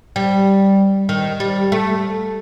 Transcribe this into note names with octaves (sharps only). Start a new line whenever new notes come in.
G3
D#3
G3
A3